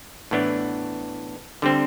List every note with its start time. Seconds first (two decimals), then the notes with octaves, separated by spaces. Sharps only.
0.31 A2 E3 B3 D4
1.62 D3 G3 C4